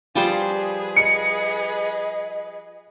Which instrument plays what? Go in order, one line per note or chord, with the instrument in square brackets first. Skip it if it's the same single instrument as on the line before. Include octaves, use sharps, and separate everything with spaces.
[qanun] F3 G3 C5 [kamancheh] G#4 B4
[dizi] D#5 [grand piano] C#7